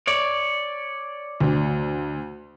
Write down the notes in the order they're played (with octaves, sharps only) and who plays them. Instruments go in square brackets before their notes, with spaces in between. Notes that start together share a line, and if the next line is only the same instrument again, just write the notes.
[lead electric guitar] C#5 D5
[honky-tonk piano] D2